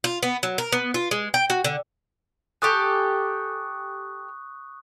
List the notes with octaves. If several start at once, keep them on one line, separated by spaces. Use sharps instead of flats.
F4
B3
F#3
A#4
B3
F4
G#3
G5
F#4
D3
G4 A4 G#5 C#6 D#6 F#6